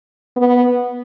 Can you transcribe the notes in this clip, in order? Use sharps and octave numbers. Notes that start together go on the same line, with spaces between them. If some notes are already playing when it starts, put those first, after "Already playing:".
B3